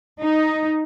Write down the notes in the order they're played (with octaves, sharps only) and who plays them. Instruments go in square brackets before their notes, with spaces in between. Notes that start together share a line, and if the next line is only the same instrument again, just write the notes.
[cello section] D#4